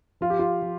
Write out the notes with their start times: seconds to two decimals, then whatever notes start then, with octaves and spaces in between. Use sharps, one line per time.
0.21 F3 F4
0.30 G4
0.39 F4
0.62 F3